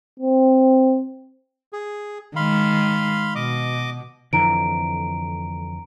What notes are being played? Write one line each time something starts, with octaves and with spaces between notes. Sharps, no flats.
C4
G#4
D#3 G#3 F5 B5 C6
B2 D#5 D6
F2 D3 E3 A#5 D7